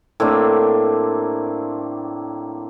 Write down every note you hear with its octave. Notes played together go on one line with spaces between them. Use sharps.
A2 A#3 C4 D4